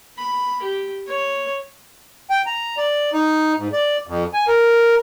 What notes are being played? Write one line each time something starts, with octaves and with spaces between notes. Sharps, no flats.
B5
G4
C#5
G5
A#5
D5
D#4
G#2
D5
F2
G#5
A#4